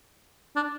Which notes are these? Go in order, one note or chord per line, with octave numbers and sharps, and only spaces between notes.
D4